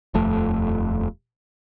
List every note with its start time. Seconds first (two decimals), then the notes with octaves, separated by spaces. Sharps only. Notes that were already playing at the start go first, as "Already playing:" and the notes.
0.14 D#1 F2 A3